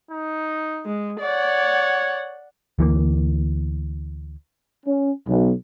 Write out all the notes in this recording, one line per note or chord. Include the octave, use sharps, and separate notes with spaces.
D#4
G#3
C#5 D5 F#5
D2 E3 F#3 A#3
C#4
B1